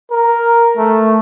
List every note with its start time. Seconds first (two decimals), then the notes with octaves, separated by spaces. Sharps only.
0.11 A#4
0.77 A3